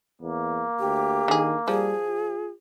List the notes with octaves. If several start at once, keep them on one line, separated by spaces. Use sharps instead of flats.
E2 A#3
D2 G4
D3 D#3 G#4
F3 G3 G#4
F4